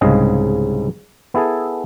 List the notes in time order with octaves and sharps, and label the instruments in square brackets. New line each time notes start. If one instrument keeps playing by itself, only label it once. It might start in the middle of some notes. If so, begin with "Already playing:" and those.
[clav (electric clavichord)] C2 G#2 C#3 G#4 D#5 F5
B3 E4 G#4 A4